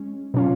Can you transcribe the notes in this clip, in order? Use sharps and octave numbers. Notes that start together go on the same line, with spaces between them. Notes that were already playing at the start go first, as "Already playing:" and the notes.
Already playing: G#3 C#4
B2 F#3 C#4 F4